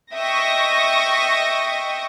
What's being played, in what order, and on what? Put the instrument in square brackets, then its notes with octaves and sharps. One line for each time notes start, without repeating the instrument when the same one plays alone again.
[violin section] D#5 E5 G5 C#6 D#6 A#6